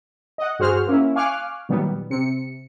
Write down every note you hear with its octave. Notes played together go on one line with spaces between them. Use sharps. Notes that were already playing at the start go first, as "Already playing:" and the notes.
D#5 F#5
G2 F#4 G#4 C5 F#5 F6
A#3 C#4 E4
F5 G#5 C#6 D6 F6 F#6
A#2 D#3 F#3 G3 B3
C3 C#7